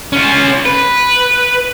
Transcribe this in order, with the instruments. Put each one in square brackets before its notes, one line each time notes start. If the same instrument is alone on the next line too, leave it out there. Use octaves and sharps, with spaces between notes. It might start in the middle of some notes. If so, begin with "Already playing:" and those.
[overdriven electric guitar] C#4 F4
B4